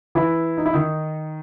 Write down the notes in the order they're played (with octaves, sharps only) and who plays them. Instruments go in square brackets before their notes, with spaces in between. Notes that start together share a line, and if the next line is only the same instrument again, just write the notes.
[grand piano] E3 E4
D#4
E4
D#3 D#4